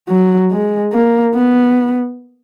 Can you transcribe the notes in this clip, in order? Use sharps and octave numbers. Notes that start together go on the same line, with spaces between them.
F#3
G#3
A#3
B3